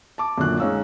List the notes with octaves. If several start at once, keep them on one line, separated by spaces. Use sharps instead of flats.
A5 D6
F#2 A#2 D3 F#6
G#3 C#4 D#4 F5 E6